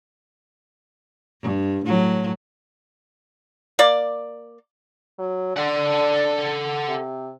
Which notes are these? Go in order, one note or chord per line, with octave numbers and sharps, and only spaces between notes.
G2
A2 F#3
A#3 D5
F#3
D4 A4 F#5
C3